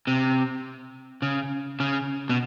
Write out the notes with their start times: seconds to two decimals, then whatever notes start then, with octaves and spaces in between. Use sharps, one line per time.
0.07 C3
1.22 C#3
1.80 C#3
2.29 B2